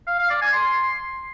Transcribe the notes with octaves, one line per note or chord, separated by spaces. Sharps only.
F5
F5
D5
G#5
C6